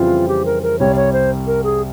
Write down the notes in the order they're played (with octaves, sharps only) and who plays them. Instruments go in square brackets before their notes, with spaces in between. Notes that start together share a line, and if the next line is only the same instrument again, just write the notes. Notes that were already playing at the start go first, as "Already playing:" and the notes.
Already playing: [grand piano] F2 C#3 E3 G3 C4 [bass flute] F4
[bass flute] G4
A#4
A#4
[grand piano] C2 C3 G3 [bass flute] C#5
[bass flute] C#5
C5
A#4
G#4